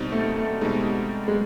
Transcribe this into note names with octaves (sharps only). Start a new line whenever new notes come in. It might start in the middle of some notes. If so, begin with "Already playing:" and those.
Already playing: B2 G3 C4 D#4
A3
A3
B2 G3 G#3 C4 D#4
G#3